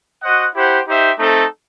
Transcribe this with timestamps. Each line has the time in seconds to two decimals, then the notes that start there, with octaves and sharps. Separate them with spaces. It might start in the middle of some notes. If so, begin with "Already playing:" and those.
0.22 F#4 C5 D#5 F#5
0.54 E4 G4 C5 F#5
0.86 D#4 G4 C5 E5
1.18 A3 C4 D#4 A4